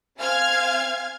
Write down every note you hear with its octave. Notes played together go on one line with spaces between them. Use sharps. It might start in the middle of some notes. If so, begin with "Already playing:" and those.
C4 F5 G#5 F6 G#6